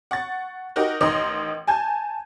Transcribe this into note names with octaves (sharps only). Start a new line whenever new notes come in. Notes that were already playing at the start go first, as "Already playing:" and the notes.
F#5 C#6 A6
D#4 F#4 G4 A#4
A1 D#3 D#5 A#5 C6
G#5 A5 G6 G#6